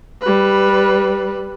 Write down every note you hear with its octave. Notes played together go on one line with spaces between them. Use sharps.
G3 B4